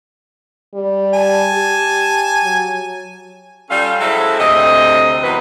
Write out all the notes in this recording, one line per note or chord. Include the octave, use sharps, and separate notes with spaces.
G3
G#5 A5
G4
F#3
G3 C#4 F4 A4 D5 F5
F#3 G#3 E4 A4 C5 E5
D2 C3 C4 D#5
E2 F#3 A#3 B4